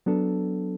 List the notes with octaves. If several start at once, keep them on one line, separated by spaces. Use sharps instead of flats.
F#3 B3 D4 A4